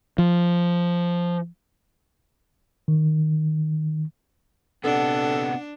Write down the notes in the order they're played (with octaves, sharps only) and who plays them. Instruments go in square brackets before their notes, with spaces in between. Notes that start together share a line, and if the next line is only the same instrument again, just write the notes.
[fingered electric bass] F3
[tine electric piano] D#3
[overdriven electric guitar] C3 B3 [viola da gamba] D4 [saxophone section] A4 [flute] F#5